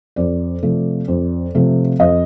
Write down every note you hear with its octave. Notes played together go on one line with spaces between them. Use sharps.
F2 D5
C3 F3 A3
F2
C3 F3 A3
F2 D#5